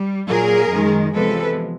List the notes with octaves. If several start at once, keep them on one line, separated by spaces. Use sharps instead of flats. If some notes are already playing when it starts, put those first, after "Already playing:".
Already playing: G3
A#2 F#3 G#4 A#4
F#2 D#3 G#3
E2 C3 F3 G#3 A4 B4